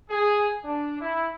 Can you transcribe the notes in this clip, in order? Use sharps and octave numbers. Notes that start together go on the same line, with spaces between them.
G#4
D4
E4